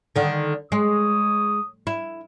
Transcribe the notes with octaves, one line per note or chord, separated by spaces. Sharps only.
D3 D#3
G#3 C#5 D#6
E4